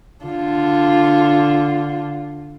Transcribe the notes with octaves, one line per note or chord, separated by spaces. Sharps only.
D3 F4